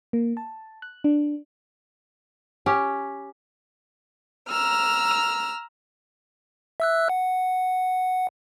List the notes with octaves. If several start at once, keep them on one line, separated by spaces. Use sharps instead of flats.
A#3
A5
F#6
D4
C#4 G4
A#5 E6 F6
E5 E6 F#6
F#5